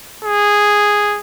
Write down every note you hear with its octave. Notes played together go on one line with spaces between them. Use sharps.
G#4